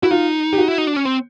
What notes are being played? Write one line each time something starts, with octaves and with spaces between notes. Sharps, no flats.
E4 F#4
D#4 F4
G4
F#4
E4
D#4
D4
C#4
C4